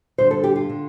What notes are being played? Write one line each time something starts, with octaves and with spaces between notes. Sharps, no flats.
G2 D3 C5
A4
G4
F4
D3